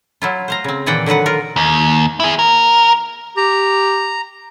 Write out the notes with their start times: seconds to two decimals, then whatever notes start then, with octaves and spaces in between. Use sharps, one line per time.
0.22 F#3 E4 F4
0.48 C5 F5 A#5
0.64 C#3 C4
0.86 A#2 D#3 E3 D5 F#5 G5
1.06 D3 D#3 F#3 B4 F#5
1.26 F4 A#4
1.56 D#2
2.20 E4 G#4
2.39 A#4
3.37 G4 A#5